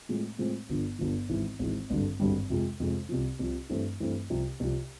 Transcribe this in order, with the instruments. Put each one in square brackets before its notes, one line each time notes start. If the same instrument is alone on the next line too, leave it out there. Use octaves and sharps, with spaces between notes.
[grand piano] A2 F3 G#3 C4
A2 F3 G#3 C4
G1 G2 D3 F3
G1 G2 D3 F3
G#1 G#2 E3
G#1 G#2 E3
G#1 G2 D3 G3
G#1 G2 D3 G3
F2 C3 F3 G#3
F2 C3 F3 G#3
C2 C3 F3
C2 C3 F3
G2 E3 A3 C4
G2 E3 A3 C4
C2 C3 F3
C2 C3 F3